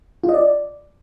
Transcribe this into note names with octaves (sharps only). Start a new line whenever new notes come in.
F4
D#5
D5